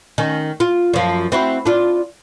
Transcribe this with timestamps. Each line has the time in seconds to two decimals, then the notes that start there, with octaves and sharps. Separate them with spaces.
0.18 D#3 C#4
0.60 F4
0.94 F#2 F3
1.32 C4 E4 F#4
1.66 D4 F4